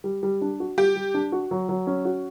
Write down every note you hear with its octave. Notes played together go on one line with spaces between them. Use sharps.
G3
G3
D4
F#4
G3 G4
G3
D4
F#4
F#3
F#3
C#4
F#4